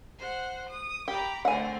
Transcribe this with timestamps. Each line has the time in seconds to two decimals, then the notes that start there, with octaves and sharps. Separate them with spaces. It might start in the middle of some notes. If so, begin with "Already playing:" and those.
0.18 C5 F#5
0.69 D#6
1.08 G4 A#5 B5 D6
1.45 D3 A3 C4 F#5 G#5